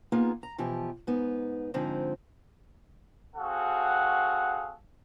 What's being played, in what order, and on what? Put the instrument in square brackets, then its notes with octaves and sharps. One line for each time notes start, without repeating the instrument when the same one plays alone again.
[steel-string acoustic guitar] A#3 B3 D#4 F4 G#4
A#5
B2 E3 F3 G4
G#2 B3 D#4
G#2 D3 F3 C4 D#4
[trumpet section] C4 F#4 G#4 A4 F5 F#5